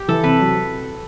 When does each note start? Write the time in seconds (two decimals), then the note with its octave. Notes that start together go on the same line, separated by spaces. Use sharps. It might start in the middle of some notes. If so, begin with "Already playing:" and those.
Already playing: G4
0.08 E3 A4
0.24 C3 B4
0.39 F#3